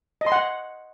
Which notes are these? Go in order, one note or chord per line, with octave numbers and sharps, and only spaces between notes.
D#5
C6
F#5